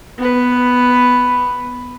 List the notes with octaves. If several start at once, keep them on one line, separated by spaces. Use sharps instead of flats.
B3 B4